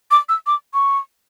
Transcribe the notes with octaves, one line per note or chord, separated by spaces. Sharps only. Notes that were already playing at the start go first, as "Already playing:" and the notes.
D6
E6
D6
C#6